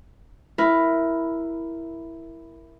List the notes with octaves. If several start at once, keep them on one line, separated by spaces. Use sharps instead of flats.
E4 A#4 B4